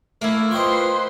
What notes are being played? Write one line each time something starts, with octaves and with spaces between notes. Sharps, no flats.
A3 A#3 E4
F4 B4 C5 D#5 G5 C6 C#6